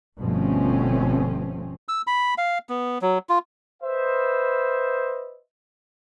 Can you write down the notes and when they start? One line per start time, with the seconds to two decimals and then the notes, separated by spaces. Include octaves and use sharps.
0.21 G1 B2 F3 A3 C4 C#4
1.89 E6
2.07 B5
2.38 F5
2.69 B3
3.02 F#3
3.29 F4
3.82 B4 C5 D#5 E5